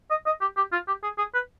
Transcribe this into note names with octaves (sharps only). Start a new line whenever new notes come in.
D#5
D#5
G4
G4
F4
G4
G#4
G#4
B4